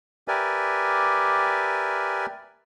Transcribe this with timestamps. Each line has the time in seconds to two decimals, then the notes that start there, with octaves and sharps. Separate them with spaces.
0.28 G4 A#4 B4 D5 E5 G#5